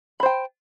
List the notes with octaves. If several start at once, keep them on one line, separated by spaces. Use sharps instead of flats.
C5 G5 B5